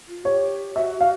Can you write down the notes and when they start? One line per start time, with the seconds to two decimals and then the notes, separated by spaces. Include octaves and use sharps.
0.08 F4
0.25 G4 C#5
0.75 F#4 E5
1.01 F5